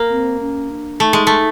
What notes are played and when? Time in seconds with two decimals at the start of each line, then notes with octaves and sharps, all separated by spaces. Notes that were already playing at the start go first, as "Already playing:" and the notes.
Already playing: A#3
0.10 C4
0.41 C#4
0.70 D4
1.00 A3 D#4
1.13 G#3
1.27 A3